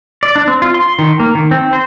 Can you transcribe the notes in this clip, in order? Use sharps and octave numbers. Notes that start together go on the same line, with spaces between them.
D5
D4
C4
F4
C6
D#3
A#3
D#3
C4
C5